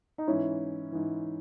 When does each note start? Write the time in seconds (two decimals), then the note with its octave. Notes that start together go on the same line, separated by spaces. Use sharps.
0.18 D#4
0.27 G#2 E3 C#4 E4
0.92 G#2 E3